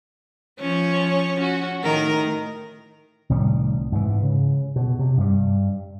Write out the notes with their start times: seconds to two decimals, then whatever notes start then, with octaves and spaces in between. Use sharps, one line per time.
0.60 F3 C#4 C#5
1.37 C#4 F#4
1.84 A2 D#3 A#4
3.30 C2 A2 D#3 G3
3.92 G#2 E3
4.22 C#3
4.76 B2
4.99 C3
5.17 G2 G3